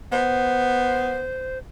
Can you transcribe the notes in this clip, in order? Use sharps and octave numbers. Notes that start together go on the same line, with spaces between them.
B3 C5